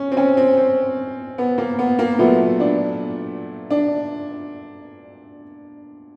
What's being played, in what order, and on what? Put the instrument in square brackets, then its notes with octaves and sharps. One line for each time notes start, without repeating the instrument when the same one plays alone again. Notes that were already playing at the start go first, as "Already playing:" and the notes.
Already playing: [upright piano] C#4
C4
C#4
C4
C4
B3
A#3
B3
A#3
A#2 F#3 A3 B3
D4
D4